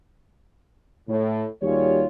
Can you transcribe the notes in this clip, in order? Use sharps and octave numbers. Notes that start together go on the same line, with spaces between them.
A2
D#2 G3 F4 F#4 G#4 C#5